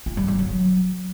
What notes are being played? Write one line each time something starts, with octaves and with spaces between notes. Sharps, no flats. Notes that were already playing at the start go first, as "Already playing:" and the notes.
F4
G3
G3
F#3